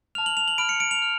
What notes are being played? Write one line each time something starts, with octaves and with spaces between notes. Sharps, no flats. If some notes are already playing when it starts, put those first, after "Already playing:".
A5 F6 F7
F#7
F7
F#7
B5 F6 D7
C#7
D7
F7
F6